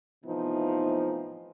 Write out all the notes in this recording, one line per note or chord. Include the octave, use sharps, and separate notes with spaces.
A2 C3 E3 F3 B3 D#4